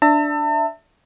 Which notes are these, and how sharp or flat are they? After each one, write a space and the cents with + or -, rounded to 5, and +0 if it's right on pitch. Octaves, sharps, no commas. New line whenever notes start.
D4 +0 E5 +0 A5 +40